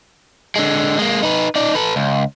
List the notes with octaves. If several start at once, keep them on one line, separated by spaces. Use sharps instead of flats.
D3 G#3
G#3 A#3
D#4 B4
D#4 D5
A4 B4
C#2